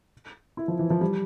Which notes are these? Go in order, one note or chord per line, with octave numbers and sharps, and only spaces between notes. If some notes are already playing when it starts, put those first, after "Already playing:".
E4
F3
E3
F3
G3